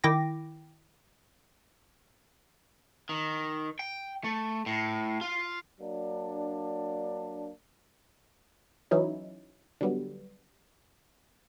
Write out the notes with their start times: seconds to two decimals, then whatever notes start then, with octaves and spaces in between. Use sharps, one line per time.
0.04 D#3 E4 G5 D6 A#6
3.09 D#3
3.79 G5
4.24 A3
4.66 A2
5.21 F4
5.81 F#3 A#3 D4
8.91 E3 F#3 C#4 D#4 E4
9.81 D3 F#3 G3 B3